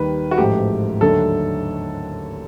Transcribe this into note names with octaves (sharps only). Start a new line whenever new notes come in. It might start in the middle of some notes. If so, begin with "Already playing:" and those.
Already playing: D#2 D#3 G3 B4
F#4
A1 G#2 F3 A3 G4
D#2 D3 F#3 A3 A4